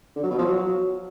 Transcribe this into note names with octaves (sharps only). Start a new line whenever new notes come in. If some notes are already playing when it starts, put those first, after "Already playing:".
D3
F#3
B2
F3
F#3